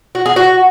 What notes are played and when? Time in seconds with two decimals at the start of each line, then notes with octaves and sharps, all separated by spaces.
0.15 F#4
0.26 G#4
0.36 F#4